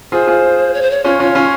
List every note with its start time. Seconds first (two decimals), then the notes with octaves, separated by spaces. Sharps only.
0.12 F4 G#4 C5
0.27 F4 G#4
0.74 C#5
0.82 C5
0.90 C#5
1.04 C#4 F4 C#5
1.19 C#4 F4 C#5
1.35 C#4 F4